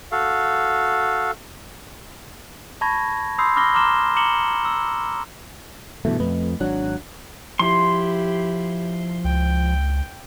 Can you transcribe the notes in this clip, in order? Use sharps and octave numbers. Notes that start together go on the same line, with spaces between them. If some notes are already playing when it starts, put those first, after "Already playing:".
F#4 A4 F5
A5 B5 C#6 G#6 A#6
B5 C6 D#6 E6 G6 C7
B5 D6 E6 F6 A#6 G7
A#5 C6 D6 F6 E7 G7
A#5 D6 C#7 E7 F#7 G7
E6
G2 B2 E3 A3
F2 A3 B4 D#5
G#1 F#3 D4 F#6
F3 E4 G4 C6
C#2 G5